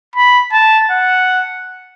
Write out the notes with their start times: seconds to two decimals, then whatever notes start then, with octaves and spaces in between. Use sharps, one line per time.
0.16 B5
0.52 A5
0.91 F#5